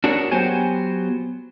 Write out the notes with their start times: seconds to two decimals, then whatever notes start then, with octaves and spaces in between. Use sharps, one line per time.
0.04 D4 F#4 G#4 A#4 C#5
0.31 F#3 B3 G4 C5 C#5 G#5